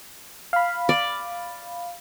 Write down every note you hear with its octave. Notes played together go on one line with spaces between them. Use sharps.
F5 B5
D5